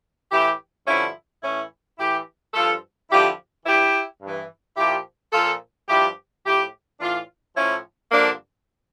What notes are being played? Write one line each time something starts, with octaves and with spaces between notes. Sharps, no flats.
A2 E3 E4 G4
G2 D3 F3 C#4 E4
A2 E3 C#4 E4
A2 E3 E4 G4
G2 F3 F4 A4
G2 D3 F3 E4 G4
G2 E3 E4 G4
G2 E3
A#2 F3 E4 G4
A#2 F3 F4 A4
G2 F3 E4 G4
A2 F3 E4 G4
A2 E3 D4 F4
A2 F3 C#4 E4
G2 D3 F3 A#3 D4